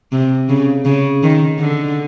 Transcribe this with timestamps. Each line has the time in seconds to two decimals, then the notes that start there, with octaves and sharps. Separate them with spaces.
0.12 C3
0.49 C#3
0.85 C#3
1.23 D#3
1.59 D3